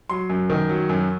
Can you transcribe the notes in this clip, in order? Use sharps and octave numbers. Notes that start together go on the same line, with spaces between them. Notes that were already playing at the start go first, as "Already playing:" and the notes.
F#3 C6
F#2
D#3
F#3
F#2